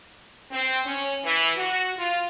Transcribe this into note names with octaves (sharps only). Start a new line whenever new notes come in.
C4
C#4
E3
F#4
F4